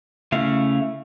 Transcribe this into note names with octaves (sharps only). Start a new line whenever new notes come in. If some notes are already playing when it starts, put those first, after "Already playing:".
C#3 A3 E4 F5